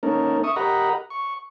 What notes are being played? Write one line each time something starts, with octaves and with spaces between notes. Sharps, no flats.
A#3 C#4 D#4 A4 A#4
E5 C#6 D#6
G4 A#4 D#5 F#5 A#5 B5
C#6